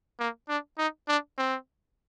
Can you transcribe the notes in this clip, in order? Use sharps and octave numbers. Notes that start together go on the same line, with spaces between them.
A#3
D4
D#4
D4
C4